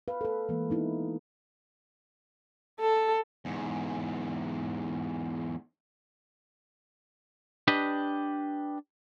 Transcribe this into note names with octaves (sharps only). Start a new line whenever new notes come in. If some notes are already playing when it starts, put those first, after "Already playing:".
B4 F5
A4 B4
E3 G#3 A#3
B3 D#4 E4
A4
E2 G#2
D4 G4 B4 D#5